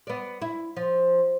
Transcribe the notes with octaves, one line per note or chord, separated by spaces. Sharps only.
B3 D5
E4
F3